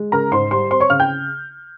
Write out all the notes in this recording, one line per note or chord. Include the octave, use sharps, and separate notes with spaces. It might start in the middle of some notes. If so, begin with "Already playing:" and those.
Already playing: G#3
C#3 A#4 A#5
G#2 C5 C6
G3 C5 C6
C4 C5 C6
C#5 C#6
C#3 F5 F6
G5 G6